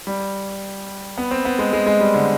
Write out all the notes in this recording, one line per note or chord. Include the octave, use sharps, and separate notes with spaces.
G3
B3
C4
B3
G#3
G#3
G#3
G3
D3